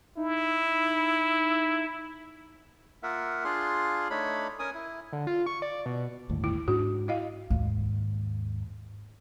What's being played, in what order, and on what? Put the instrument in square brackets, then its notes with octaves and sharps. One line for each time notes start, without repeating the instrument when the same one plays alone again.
[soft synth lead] D#4 [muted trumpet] E4
[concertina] A#3 F4 A#4 E5 F#5
D4 F4 G#4 C6
A3 D4 D#4 C#5 B5
C#4 A#4 G#5 D#6
E4
[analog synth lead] D3
F4
C#6
D5
B2
[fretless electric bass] G1 D#2 A2
[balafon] E4
[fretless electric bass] G#2 D4 [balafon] F#4
[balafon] E4 D#5 F5
[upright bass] D#2 G#2